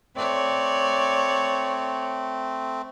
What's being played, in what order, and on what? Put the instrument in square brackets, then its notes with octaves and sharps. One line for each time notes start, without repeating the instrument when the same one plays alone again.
[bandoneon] A3 C4 [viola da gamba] C#5 D5